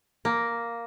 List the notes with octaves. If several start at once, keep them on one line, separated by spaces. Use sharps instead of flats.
A#3